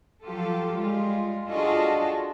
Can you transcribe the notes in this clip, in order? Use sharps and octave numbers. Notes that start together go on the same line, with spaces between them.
F3 F#3 F4 G4 A4
G3 G#3 F4
D4 F4 F#4 G#4 A4 D#5